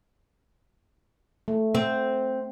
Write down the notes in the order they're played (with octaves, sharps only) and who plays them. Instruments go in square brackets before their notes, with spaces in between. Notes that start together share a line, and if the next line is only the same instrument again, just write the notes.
[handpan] A3
[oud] C4